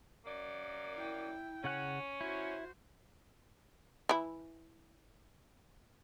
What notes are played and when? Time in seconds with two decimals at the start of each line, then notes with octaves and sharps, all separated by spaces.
0.25 F#2 A#3 D5
0.97 E4 G5
1.64 C#3 C#4 F#5 F#6
2.21 E4 F#4 C5
4.09 E3 E4